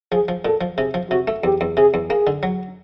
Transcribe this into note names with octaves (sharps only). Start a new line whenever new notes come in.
F3 G#4
F3
A#2 A4
F3
C3 G#4
F3
C3 F#4
A3
E2 G4
E2
C3 G#4
E2
A#3 G#4
D3
F#3